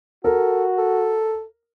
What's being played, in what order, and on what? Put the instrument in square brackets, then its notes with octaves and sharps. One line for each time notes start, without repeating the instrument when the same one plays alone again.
[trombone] F#4 [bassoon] A4 [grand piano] A#4
[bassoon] A4